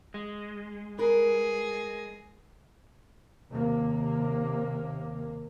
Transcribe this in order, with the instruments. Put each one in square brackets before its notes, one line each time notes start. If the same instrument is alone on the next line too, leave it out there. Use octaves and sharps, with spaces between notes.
[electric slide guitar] G#3
[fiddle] G#4 [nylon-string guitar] A#4 B4
[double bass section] D#2 C3 A#3